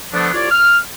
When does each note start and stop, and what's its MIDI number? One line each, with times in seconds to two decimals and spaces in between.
0.13 0.30 50
0.13 0.30 53
0.13 0.30 57
0.13 0.30 59
0.13 0.30 62
0.34 0.47 36
0.34 0.47 65
0.34 0.47 73
0.34 0.47 74
0.51 0.78 89